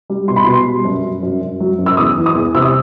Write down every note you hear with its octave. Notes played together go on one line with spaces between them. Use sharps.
G3
B2 C6
B5
B2 C6
G3
F#2
F#2
F#2
F#2
F#3
F#2
E6
E2 D#6
E3
D#6
E2
C3 E6
D#6